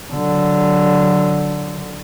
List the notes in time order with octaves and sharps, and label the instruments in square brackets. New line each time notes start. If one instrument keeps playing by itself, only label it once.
[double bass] D3 F#3